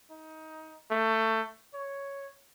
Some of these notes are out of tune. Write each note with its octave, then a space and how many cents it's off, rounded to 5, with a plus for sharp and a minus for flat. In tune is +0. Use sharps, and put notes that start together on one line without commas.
D#4 +20
A3 +20
C#5 +0